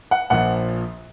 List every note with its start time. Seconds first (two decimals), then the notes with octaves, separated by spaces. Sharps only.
0.11 F#5
0.30 A#1 A#2 F3 F#5